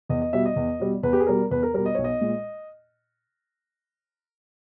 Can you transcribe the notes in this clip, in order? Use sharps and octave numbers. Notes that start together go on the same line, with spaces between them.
E2 D#5
D#5
B2 G3 E5
D#5
E2
B2 G3
E2 B4
G4
G#4
B2 G3 A#4
E2 B4
A#4
B2 G3 A#4
D#5
B1 C#5
D#5
A#2 G#3